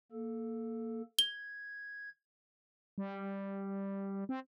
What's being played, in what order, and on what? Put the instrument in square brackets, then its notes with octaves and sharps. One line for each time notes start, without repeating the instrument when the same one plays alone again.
[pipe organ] A#3 A4
[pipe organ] G#6 [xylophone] G7
[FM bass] G3
C4